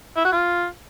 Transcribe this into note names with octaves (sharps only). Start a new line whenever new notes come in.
E4
F#4
F4